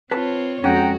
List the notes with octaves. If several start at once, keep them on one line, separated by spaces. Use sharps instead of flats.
C4 F4 B4 C#5 A5
F2 G#3 C#4 F#4 F#5 G5 A#5